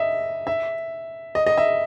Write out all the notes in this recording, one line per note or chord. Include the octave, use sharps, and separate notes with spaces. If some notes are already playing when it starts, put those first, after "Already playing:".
Already playing: D#5 E5
E5
D#5
D#5
E5